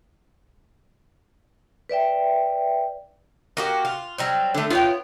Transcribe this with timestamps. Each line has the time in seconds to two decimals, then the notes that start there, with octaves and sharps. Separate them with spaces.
1.89 B4 D5 E5 G5
3.57 A#3 F#4 G4
3.85 F4
4.18 F#3 G3 C4
4.54 D3 A3
4.70 B3 F4 C#5 G5